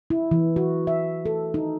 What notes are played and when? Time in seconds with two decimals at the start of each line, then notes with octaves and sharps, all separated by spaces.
0.10 E4
0.31 E3
0.56 F#4
0.87 E5
1.26 A4
1.54 D#4